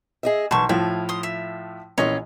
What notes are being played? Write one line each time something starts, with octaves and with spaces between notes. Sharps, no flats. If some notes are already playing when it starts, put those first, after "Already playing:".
G#4 D#5 E5
B1 E3 A5 C#6
A2 F3 E4 F5
C6 D#6
E5
A#1 E3 C#4 F4 C#5 D#5